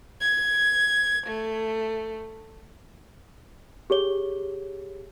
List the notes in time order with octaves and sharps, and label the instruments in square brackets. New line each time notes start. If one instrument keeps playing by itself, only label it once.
[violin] G#6
A3
[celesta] G4 G#4 C#5 G7